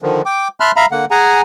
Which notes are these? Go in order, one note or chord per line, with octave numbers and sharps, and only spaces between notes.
D3 D#3 F3
G5 D6
E5 A5 B5 C6 F6 F#6
E5 F5 A#5 B5
D3 A#3 F#5
G#4 F#5 G#5 A#5